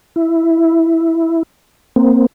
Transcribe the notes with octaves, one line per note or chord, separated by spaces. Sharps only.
E4
A#3 C4